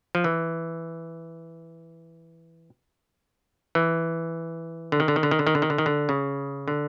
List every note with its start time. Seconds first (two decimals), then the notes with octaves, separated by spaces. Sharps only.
0.15 F3
0.24 E3
3.75 E3
4.92 D3
5.00 D#3
5.08 D3
5.16 D#3
5.23 D3
5.31 D#3
5.39 D3
5.47 D#3
5.55 D3
5.62 D#3
5.70 D3
5.78 D#3
5.86 D3
6.09 C#3
6.68 D3